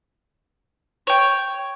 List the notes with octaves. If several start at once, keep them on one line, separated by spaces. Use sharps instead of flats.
C#5 G5